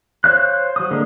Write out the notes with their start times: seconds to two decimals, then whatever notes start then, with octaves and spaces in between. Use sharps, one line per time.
0.24 C5 C#5 F5 F#6
0.76 F#3 D#6
0.91 D3 G#3 A#3